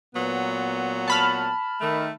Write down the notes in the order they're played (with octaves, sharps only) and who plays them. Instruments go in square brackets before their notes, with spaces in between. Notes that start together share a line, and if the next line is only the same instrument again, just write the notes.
[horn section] A#2 F#3 B3
[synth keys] A5 B5 F6
[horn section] D#3 A3